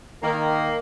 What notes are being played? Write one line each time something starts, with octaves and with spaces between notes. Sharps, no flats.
D#3 A#3